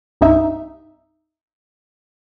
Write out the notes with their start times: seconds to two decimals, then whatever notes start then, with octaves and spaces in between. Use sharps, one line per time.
0.21 C2 G2 D#4 E5